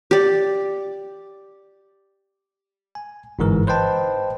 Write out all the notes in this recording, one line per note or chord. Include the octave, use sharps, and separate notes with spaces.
G4 D5
G#5
G1 G#2 E3 A#4
B4 C5 D#5 G5 A5